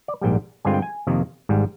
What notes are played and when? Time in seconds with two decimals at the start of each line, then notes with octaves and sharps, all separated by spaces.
0.08 D5
0.21 A#1 G#2 G3 G5
0.65 G2 D3 G#3 C4 F4 G#5
0.74 G5
0.82 G#5
1.07 F2 C3 D#3 A#3
1.49 G#1 G#2 G3